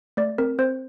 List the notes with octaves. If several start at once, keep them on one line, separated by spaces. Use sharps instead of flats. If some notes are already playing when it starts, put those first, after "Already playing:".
A3 D5
C4 A#4
C4 C5